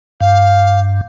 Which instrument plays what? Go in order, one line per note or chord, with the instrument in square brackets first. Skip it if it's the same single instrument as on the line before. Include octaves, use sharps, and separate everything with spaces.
[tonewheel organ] G2 [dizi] F5